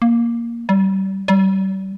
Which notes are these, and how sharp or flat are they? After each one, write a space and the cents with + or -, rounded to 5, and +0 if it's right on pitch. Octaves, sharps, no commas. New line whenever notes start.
A#3 +5
G3 -30
G3 -35